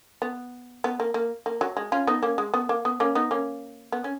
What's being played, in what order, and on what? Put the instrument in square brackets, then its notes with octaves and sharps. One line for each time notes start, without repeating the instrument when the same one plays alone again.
[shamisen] B3
B3
A#3
A#3
A#3
F#3
G#3
C#4 F4
B3 D#4
A#3 C#4
G#3
B3
A#3
B3
A#3 C#4
B3 D#4
A#3 C#4
B3
C#4